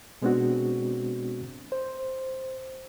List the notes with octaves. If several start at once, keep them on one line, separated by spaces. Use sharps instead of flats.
B2 G#3 B3 C4 D4 F#4
C5